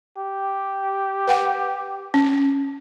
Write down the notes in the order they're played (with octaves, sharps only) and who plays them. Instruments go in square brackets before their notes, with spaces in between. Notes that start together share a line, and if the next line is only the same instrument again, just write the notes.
[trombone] G4
[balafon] B4 F#5 G5
C#4